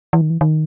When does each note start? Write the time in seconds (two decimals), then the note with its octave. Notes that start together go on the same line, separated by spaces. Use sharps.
0.13 E3
0.21 D#3
0.30 E3
0.41 D#3